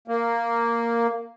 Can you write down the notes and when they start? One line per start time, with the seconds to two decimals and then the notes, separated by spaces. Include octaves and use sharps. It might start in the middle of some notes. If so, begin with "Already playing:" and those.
0.08 A#3